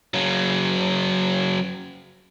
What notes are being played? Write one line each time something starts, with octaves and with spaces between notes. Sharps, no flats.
C#3 F#3